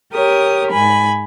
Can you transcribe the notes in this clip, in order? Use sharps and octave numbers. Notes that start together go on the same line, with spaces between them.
G4 A#4 C#5 D#6
G#2 G#5 B5